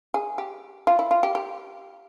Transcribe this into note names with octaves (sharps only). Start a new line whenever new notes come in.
G#4
G4
F4
E4
F4
G4
G4